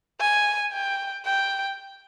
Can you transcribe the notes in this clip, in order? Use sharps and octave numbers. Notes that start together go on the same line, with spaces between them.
G#5
G5
G5